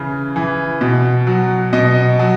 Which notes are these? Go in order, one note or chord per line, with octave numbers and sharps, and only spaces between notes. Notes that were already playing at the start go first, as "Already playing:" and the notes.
Already playing: C#3 E3
E3
B2
F#3
B2 D#5
F#3